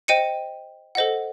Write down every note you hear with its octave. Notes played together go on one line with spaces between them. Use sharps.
C5 D#5 G5 C#7 D#7
A4 C5 D#5 F#5